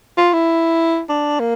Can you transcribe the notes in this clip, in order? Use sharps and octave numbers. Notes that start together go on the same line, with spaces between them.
F4
E4
D4
A#3